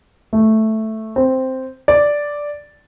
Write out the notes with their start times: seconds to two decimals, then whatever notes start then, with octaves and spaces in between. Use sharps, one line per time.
0.33 A3
1.16 C4
1.88 D5